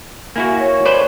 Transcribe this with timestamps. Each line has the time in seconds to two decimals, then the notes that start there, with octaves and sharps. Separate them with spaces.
0.36 A#3 E4 F#4 G#5
0.59 C#5
0.85 B4 C5 D5